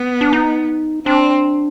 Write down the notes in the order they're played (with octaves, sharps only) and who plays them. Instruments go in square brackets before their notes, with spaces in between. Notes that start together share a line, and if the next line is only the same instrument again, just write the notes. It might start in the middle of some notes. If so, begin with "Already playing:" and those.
Already playing: [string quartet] B3
[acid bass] D4
D#4
[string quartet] C4 [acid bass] D4